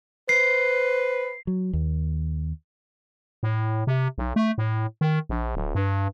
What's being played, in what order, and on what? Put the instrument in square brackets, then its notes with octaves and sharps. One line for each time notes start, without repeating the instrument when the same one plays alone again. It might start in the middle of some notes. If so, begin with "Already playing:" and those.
[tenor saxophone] B4 [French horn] C5 [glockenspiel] C7
[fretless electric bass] F#3
D#2
[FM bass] A2
C3
B1
A3
A2
D#3
A#1
D1
G2